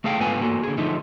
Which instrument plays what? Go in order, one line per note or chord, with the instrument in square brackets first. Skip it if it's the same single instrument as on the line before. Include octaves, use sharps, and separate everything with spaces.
[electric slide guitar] A3 G#4 A4 F5 G5
G#2 B3 F4 A4 G#5
A#3 F#4 A4
D3 G#4
D3 F3 A3 D#4